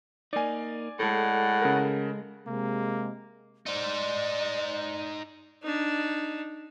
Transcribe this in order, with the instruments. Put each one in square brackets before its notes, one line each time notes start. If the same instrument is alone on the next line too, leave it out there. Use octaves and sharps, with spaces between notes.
[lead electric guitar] A#3 D#4 [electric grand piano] D5 G#5
[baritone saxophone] A2 [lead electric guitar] G#3 A4 [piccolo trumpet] F#5
[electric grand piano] C#3 A#4
[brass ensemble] C3 G#3 [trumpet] A#3
[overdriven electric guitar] D#4 C5 [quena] D5
[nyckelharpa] D4 D#4